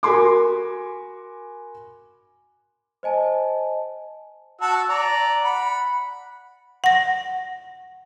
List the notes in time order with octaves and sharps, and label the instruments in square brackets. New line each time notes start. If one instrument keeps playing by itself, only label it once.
[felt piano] F#4 A#4 G#5 B5 C6 D6
[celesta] C5 D#5 G#5 A5
[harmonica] F#4 A5 E6
D5 A#5
F#5 B5
[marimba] F#5 A#6